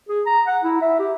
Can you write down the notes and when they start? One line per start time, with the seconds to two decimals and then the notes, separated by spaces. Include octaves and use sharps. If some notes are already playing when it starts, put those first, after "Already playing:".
0.09 G#4
0.26 A#5
0.47 F#5
0.63 E4
0.82 E5
0.99 G4